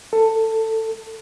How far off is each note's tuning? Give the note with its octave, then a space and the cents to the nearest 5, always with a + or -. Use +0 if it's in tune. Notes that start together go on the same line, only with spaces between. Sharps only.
A4 +15